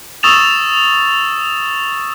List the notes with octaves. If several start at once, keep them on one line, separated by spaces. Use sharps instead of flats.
C#6 D#6 E6 A6 E7 F7